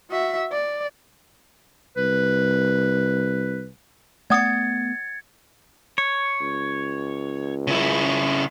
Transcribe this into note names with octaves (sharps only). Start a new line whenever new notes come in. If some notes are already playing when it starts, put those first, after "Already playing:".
F#4 E5
D5
C2 B4
A3 B3 D5 F#5 D#6 G#6 A6 C#7
C#5
C#2
C#3 E4